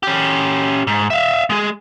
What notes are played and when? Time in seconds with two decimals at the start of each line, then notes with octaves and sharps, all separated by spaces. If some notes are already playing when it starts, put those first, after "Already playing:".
0.03 C#4 G4
0.87 G#2
1.10 E5 F5
1.50 G#3 G#4